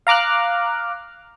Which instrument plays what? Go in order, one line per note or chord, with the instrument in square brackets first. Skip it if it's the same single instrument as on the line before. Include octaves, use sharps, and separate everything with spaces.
[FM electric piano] F5 A#5 D6 F6 F#6